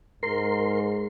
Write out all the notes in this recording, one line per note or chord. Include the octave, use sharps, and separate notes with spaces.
G#2 A#4 C6